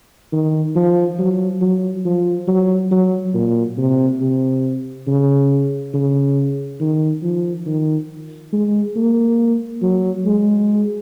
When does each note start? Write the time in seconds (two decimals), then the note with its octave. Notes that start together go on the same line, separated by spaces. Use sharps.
0.32 D#3
0.75 F3
1.18 F#3
1.61 F#3
2.05 F3
2.47 F#3
2.91 F#3
3.34 A#2
3.77 C3
4.20 C3
5.07 C#3
5.93 C#3
6.80 D#3
7.22 F3
7.66 D#3
8.53 G#3
8.96 A#3
9.82 F#3
10.25 G#3